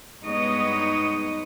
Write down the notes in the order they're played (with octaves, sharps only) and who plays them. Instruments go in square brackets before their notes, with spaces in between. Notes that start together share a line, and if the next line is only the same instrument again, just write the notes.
[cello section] G2 G#3 B3 D#4 C#5 D#5